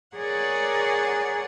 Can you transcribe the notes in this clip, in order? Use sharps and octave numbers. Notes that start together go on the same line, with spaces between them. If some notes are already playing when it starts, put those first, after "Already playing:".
G#4 A#4 C#5 D5 F#5 G#5